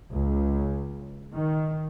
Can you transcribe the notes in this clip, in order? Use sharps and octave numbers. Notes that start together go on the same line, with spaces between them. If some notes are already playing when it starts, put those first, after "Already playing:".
C#2
D#3